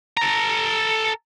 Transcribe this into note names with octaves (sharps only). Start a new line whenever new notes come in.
A4 A#5